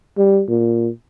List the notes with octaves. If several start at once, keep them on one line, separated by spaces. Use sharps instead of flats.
G3
A#2